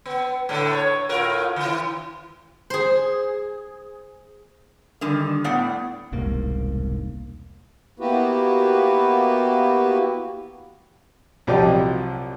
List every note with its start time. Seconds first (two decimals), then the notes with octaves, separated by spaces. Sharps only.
0.06 B3
0.49 A2 D3 A3
0.74 C#5
1.09 A2 F4 A#4
1.56 D#3 E4
2.70 G#4 C5
5.01 D3 D#3 G3
5.44 A2 B3 D5 F#5
6.12 E1 C2 G#2 A#3
8.00 A#3 B3 E4 F#4 G4 B4
11.47 C2 F3 F#3 G4 D5 D#5